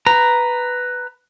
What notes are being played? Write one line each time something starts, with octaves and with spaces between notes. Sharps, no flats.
B4 A#5